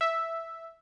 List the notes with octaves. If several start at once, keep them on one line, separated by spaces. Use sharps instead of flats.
E5